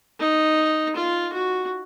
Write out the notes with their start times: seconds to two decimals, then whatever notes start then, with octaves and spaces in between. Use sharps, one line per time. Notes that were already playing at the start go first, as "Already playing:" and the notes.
0.20 D#4
0.96 F4
1.33 F#4